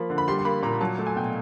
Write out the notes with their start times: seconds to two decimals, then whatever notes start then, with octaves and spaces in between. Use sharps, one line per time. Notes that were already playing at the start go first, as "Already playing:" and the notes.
Already playing: F3 A#3 B5
0.10 D3
0.18 B5
0.28 G3 C6
0.38 C6
0.45 A#3 B5
0.63 A#2 A#5
0.81 F#3 A5
0.98 A3
1.07 G#5
1.16 B2 G5